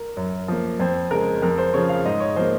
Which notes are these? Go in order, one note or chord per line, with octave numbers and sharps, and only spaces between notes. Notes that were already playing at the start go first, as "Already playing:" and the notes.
Already playing: A#4
F#2
F3 A#3
F2 C5
C#3 G#3 A#4
F2 A#4
C5
C#3 F3 C#5
F5
G#2 D#5
C#5
F3 A#3 C5